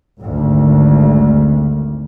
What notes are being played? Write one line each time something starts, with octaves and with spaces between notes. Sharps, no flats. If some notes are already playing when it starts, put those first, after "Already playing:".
G#1 D2